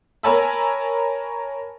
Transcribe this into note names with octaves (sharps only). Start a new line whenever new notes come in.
A#4 C#5 G#5 A5 B5 E6